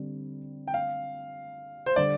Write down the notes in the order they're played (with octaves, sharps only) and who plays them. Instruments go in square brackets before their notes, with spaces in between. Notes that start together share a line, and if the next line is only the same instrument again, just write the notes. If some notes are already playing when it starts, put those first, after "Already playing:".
Already playing: [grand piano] D3 G3 C4
[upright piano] G5
F5
C5
[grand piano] D3 G3 [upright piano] D5